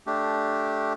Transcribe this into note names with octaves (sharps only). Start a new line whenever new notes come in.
A3 D4 G4